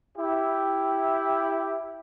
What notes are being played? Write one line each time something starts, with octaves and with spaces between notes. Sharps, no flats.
E4 G4